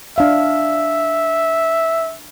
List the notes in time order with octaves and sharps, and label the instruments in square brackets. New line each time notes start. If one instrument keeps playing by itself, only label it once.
[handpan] D4 F5 [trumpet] E5